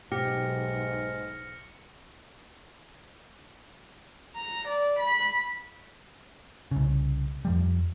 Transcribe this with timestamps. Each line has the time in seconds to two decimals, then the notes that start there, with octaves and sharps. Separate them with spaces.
0.12 B1 G#2 G4 F6 A#6 C#7
4.35 A#5
4.68 D5
4.99 B5
6.71 C2 C#3
7.45 F2 F3 G3